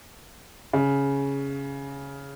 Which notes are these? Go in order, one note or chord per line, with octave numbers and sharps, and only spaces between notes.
C#3